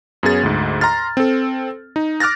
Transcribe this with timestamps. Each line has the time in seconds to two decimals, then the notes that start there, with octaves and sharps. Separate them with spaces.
0.23 F#2 B3 C#4 G#4 A6
0.43 D2 G#2
0.81 A#5 C6 F6 A6
1.17 C4 A4
1.96 D#4
2.20 D6 F6 F#6 A6 A#6